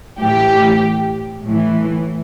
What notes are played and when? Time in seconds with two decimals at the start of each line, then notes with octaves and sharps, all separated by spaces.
0.20 A2 E3 G4
1.43 A2 E3